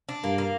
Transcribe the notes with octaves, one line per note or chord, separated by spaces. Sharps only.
D4
G2 A#3
A#3